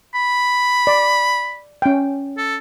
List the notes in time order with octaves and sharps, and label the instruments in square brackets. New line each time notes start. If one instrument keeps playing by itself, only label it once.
[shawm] B5
[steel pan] D5
C#4 G5
[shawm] A4